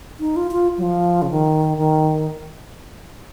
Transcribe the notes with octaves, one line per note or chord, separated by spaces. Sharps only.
D#4
F4
F4
F#3
F3
C#3
D#3
D#3